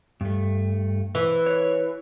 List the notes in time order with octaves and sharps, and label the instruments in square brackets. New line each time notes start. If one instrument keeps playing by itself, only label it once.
[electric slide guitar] G2 A3
[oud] E3
[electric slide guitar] C#5